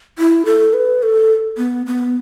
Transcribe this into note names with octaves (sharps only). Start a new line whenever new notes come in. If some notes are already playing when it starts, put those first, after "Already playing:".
E4
A4
B4
A4
B3
B3